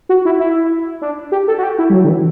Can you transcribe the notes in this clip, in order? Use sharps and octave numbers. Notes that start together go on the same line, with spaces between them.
F#4
E4
E4
D4
G4
A4
F#4
G4
E4
G3
F#3
D3
E3